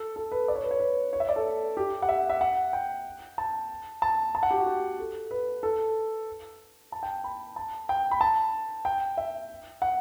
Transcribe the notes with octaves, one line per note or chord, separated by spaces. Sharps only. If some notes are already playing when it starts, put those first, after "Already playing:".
Already playing: A4
A4
B4
D5
C#5
B4
C#5
B4
C#5
E5
D5
A4
G4
F#5
E5
E5
F#5
G5
A5
A5
A5
F#5
G4
F#4
G4
A4
B4
A4
A5
G5
B5
A5
G5
B5
A5
G5
E5
F#5